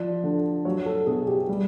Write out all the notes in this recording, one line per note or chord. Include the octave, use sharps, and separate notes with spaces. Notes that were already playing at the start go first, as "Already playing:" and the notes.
Already playing: F3 D5
D3
F#3 C#5
A4
B2 G#4
G4
G3